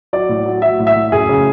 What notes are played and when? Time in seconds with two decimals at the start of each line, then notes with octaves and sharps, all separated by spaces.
0.13 F#3 D5
0.29 A2
0.46 F#3
0.62 F#3 E5
0.79 A2
0.87 E5
0.96 A2
1.12 F#2 G#4
1.29 C#3